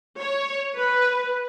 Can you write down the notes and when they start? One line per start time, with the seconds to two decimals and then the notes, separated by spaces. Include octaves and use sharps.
0.20 C#5
0.77 B4